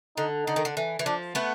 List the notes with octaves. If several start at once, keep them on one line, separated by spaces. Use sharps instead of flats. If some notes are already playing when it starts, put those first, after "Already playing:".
D3 D#4
D3 D#4
D#3
D3
E3
E3
F3 D4
A3 B3